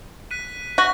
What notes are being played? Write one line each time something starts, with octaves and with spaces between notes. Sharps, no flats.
F#6 B6 D#7
F#4 C#6 A#6